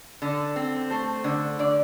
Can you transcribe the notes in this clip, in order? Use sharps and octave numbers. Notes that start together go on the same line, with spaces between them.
D3
C4
A3 C5
D3
D3 D5